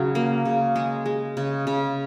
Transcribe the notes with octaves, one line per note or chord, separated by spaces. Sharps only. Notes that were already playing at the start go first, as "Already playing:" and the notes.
Already playing: C#3 F#3
A#3
C#3
G#3 G#4
G#3
C#3
C#3